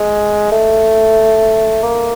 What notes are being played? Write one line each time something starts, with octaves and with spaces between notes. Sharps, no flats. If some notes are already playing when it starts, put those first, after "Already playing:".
Already playing: G#3
A3
A#3